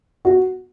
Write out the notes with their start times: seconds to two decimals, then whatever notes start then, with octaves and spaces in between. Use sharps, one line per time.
0.25 F#4